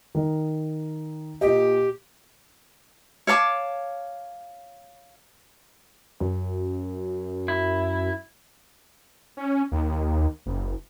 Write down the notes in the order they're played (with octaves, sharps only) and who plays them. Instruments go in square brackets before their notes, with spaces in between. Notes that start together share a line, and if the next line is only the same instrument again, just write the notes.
[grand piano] D#3
[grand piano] A#2 D#5 [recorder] G4
[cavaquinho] C#5 F5 A5 D6
[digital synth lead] F#2
[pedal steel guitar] E4
[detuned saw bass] C#4
D#2
F#1